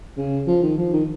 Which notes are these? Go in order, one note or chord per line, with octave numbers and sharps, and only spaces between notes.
C#3
F3
D#3
F3
D#3